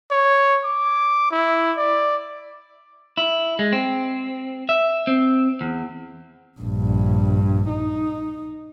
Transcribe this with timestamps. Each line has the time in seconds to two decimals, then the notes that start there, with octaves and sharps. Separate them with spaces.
0.11 C#5
0.65 D6
1.31 E4
1.77 D5
3.17 E4
3.59 G#3
3.73 C4
4.69 E5
5.07 C4
5.61 E2
6.60 A#1 G2
7.69 D#4